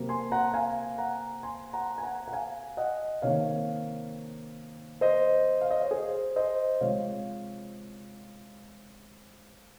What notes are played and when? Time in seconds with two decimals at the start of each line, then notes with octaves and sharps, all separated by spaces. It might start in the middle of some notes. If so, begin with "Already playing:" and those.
Already playing: C3 F#3 A#3
0.09 G#5 C6
0.31 F#5 A#5
0.54 F5 G#5
0.98 F#5 A#5
1.43 G#5 C6
1.73 F#5 A#5
1.98 G#5
2.03 F#5 A#5
2.28 F#5
2.33 F5 G#5
2.77 D#5 F#5
3.22 C3 D#3 A#3 C#5 F5
5.01 C5 D#5
5.61 F5
5.71 D#5
5.81 C#5
5.91 G#4 C5
6.36 C5 D#5
6.81 C3 F3 G#3 C#5 F5